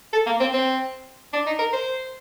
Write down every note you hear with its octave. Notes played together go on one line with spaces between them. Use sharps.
A4
A#3
C4
C4
D4
D#4
A#4
C5